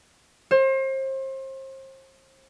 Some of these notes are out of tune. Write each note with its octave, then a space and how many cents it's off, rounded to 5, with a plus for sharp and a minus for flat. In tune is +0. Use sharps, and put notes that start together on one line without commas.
C5 +35